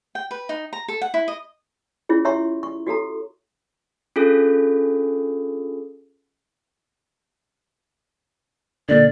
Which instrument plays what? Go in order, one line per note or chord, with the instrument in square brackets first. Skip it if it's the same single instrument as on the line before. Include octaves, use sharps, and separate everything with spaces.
[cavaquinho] G5
B4
D#4
A#5
A4
F#5
E4
D#5
[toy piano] C#4 E4 F4 G#4
G4 C#5 E5 A#5 C6 C#6
C#6
F#4 G4 A4 A#5
[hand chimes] C#4 D4 F4 G#4 A4
[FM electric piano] A#2 D3 [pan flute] D5